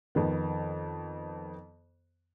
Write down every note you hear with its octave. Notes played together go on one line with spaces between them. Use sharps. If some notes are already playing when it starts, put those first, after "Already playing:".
F2 D#3 B3